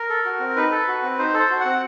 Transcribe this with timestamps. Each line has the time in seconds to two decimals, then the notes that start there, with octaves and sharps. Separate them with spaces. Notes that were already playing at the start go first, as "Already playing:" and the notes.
Already playing: A#4
0.09 A4
0.25 F#4
0.40 C4
0.56 D#4 B4
0.71 A4
0.88 F#4
1.03 C4
1.19 D#4 C5
1.34 A4
1.39 C5
1.50 F#4
1.60 F#5
1.65 C4